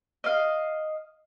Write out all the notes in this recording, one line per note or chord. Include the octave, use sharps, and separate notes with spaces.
D#5 F5